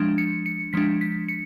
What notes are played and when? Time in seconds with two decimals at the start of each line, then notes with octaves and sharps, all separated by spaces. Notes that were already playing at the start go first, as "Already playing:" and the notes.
Already playing: F3 G#3 D4
0.18 C#7
0.46 C#7
0.73 F3 G#3 D4 B6
1.01 B6
1.29 C#7